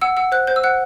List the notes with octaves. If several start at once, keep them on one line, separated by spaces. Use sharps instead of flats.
F#5 E6
F#5 E6
C5 F#6
C5 G6
E6
F#5 F#6